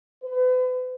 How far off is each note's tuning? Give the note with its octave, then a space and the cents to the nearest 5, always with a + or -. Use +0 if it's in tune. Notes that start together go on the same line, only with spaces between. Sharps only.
B4 +40